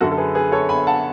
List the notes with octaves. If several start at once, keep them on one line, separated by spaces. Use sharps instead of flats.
F#2 D3 F#4 A4
A4
G#4 B4
G#4 B4
A4 C#5
G#5 B5
F#5 A5